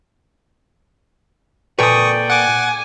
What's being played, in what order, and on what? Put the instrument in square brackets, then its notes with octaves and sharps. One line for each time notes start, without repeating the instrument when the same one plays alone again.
[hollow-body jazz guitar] A#2 A4 B4 [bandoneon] D5 G5 [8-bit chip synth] C#6 D#6
[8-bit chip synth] F#5 D6 [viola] G#5